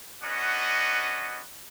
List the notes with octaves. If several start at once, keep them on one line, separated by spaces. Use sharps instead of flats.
C#4 D4 F#4 B4 D#5 F#5